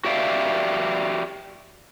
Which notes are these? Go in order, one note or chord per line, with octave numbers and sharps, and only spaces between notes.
F#4 G4 D5 E5 F5